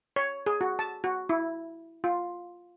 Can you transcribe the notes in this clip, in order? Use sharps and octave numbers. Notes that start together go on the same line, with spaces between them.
C#5
G#4
F#4
A5
F#4
E4
F4